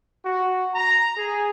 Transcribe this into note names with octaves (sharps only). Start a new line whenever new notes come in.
F#4
A#5
G#4